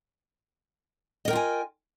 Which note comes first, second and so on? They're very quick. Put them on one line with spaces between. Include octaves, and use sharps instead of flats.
D#5 A#4 G5 F4 G#5